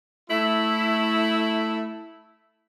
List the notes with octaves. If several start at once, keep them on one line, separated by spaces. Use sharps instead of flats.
A3 E4